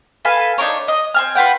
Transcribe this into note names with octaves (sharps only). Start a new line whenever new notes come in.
A4 B4 F5 G#5
D4 D#4 A#4 C#5
D#5
C4 G#5 F6
F4 B4 F#5 G5